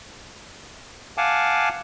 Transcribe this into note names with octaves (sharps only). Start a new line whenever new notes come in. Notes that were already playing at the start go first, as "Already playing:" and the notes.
F5 F#5 G#5 A5 D6